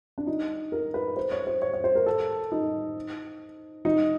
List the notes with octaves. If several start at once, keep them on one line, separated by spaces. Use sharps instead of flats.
D4
D#4
A#4
B4
C5
C#5
C5
C#5
C#5
C5
A#4
A4
D#4
D#4